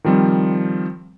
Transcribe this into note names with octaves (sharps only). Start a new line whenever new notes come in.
D#3 F3 G3 C4